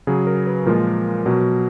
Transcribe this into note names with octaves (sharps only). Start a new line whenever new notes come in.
C#3 F#3 G#4
A#4
B4
A#2 F3 G#3 A#4
B2 F#3